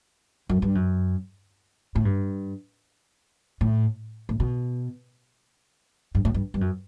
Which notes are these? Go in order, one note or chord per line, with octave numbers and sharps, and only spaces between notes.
F#2
G2
F#2
A2
G2
A2
A2
B2
G2
A2
G2
G2
F#2